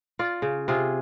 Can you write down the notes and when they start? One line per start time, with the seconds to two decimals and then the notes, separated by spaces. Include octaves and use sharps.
0.19 F4 D5
0.42 C#3
0.68 C3 F4 G#4